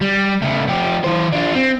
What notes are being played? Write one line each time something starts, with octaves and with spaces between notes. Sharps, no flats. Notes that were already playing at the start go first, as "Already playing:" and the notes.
G3
C#3 A3
F3 G4
E3 C5
D4 F4
C4